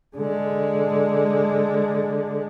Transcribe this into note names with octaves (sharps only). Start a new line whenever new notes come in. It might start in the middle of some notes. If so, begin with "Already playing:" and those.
D3 G#3